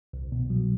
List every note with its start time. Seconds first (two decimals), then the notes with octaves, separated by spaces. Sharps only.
0.13 C2
0.32 B2
0.50 F#3